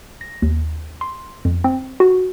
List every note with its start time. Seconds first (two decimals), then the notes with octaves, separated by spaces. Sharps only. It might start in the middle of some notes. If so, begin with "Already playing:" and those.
0.21 A#6
0.42 D#2
1.01 C6
1.45 F2
1.64 C4
2.00 F#4